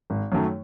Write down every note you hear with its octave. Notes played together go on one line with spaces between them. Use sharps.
G#1
F#2 D#3 F#3 A3